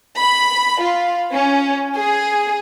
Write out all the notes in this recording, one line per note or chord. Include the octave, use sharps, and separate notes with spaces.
B5
F4
C#4
G#4